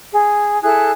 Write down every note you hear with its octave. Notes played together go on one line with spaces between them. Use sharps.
G#4
E4 G#4 A4 F#6